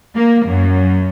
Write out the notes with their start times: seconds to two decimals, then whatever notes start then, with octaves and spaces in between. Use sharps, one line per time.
0.15 A#3
0.45 F#2